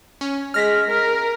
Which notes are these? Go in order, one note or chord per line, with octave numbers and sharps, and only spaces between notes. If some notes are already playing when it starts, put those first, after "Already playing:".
C#4
G#3 F6 A#6 B6
A#4